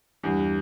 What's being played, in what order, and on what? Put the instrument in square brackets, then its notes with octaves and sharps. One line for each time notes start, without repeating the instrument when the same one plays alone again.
[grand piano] E2 [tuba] G2